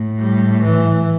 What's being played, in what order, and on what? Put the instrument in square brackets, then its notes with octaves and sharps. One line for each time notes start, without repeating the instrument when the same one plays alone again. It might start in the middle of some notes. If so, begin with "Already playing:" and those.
Already playing: [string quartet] A2
[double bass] G3
E3